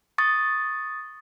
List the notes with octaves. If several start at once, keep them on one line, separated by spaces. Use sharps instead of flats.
C#6 D#6 A6